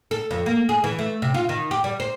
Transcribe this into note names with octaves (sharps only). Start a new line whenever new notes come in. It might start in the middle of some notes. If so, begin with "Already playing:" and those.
A4
F2
A#3
G#4
E3
A3
C3
F4
D#3
G4
G3
C5